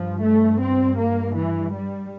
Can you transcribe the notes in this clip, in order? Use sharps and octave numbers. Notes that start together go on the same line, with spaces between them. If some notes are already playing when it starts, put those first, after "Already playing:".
Already playing: G2 F3
A3
C4
A#3
E3
G3